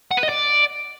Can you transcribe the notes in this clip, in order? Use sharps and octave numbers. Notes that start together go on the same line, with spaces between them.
F#5
B4
D#5
D5